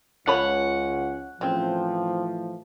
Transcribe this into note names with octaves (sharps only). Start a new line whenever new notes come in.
C#2 F3 C#4 C#5 F#5 B5
A2 C#3 E3 F3 C4